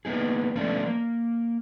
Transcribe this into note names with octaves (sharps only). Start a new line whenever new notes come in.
A#3 B3 D#4 G#4
F3 A3 B3 C#4 D4
A#3